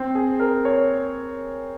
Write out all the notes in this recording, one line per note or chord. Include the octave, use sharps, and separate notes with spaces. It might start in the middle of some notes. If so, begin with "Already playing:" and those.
Already playing: C4
G#4
A#4
C#5